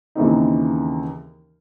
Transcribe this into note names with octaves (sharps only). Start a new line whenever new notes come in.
D#2 C#3 E3 C4 D#4